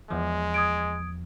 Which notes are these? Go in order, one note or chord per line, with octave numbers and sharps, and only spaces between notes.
E2 F3 G#3
D#6 G#6 D7